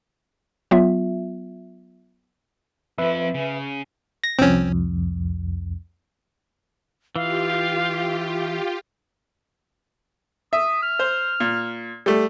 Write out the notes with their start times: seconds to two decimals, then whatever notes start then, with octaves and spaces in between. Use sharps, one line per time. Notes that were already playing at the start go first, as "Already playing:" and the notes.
0.71 F#3 B3 F4 E5
2.98 F2 F3 B4 E5
3.34 C#3
4.24 A#6
4.39 C2 F2 C4 C#4
7.16 E3 F4 G4 F5
10.53 E5 D#6
10.83 F6
10.99 C5
11.40 A#2
12.06 G3 A3